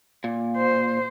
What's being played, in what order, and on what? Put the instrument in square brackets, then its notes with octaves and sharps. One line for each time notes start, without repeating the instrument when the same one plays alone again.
[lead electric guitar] A#2
[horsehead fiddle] C5